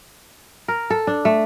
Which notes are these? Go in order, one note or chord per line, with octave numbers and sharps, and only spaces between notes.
A#4
A4
D4
A3